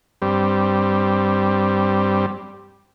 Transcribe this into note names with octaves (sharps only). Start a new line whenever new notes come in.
G2 G3 C4